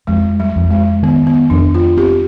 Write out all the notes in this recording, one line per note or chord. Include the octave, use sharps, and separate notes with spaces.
F2 G#3
G3
F2
G#3
D#3 B3
B3
F2 D4
F4
C4 G4